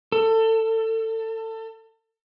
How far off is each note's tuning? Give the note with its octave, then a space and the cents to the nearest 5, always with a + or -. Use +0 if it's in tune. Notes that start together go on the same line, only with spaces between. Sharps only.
A4 +25